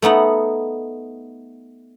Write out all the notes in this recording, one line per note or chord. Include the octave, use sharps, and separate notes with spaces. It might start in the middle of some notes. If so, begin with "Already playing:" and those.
A3 B3 D#4 F#5